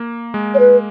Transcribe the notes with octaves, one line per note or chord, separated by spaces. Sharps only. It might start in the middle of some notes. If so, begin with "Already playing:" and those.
Already playing: A#3
G#3
C#5
B4